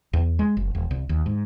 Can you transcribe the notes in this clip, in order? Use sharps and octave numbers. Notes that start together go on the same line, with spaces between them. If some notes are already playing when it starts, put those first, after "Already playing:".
E2
G#3
F#1
E1
C2
D#2
G#2